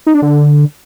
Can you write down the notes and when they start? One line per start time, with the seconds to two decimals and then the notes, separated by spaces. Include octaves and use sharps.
0.07 D#4
0.14 D4
0.22 D3